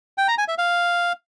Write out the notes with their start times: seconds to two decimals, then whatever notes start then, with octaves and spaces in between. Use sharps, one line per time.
0.18 G5
0.28 A#5
0.38 G#5
0.48 E5
0.58 F5